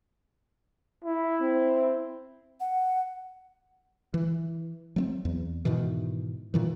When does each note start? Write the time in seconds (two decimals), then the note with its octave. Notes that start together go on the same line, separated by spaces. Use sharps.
1.05 E4
1.40 C4
2.60 F#5
4.14 E3
4.96 F#3 A3 C4
5.25 E2
5.65 G#2 B2 D#3 E3
6.54 A#2 D#3 E3